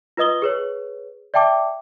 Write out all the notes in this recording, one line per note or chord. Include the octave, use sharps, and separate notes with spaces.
F4 B4 D#5 D#6 G7
G#4 B4 C#5
D5 E5 G5 A5 D6